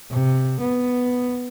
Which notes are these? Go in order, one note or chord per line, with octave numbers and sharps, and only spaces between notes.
C3
B3